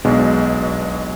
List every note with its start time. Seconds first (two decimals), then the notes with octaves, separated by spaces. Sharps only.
0.05 B1 B2 G#3 D4